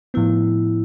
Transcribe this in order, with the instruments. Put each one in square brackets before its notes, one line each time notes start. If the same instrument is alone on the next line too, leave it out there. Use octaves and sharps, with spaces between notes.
[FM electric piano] A2 F3 B3 [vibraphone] E4